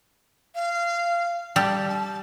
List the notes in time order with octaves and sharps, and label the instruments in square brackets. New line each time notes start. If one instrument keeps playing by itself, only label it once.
[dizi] F5
[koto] G3 [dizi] A5
[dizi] A5